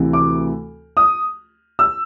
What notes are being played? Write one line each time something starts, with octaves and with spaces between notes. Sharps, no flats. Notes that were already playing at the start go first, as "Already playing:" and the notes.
Already playing: D2 C3 E3
D6
D#6
E6